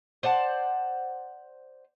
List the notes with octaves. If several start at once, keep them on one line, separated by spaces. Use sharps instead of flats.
C5 D5 F#5 A5